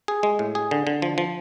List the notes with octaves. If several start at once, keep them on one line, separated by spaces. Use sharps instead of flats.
G#4
G#3
A2
G#4
D3
D3
F3
F3